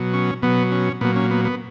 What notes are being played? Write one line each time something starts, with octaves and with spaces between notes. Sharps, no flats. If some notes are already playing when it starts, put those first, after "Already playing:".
Already playing: B2 F#3
C#4
B2 F#3 B3
C#4
A#2 F#3 B3
C#4
B3
B3